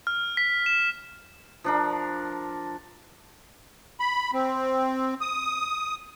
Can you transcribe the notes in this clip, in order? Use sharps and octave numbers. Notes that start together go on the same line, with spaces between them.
F6
B6
E7
F3 D4 A#4
B5
C4
D#6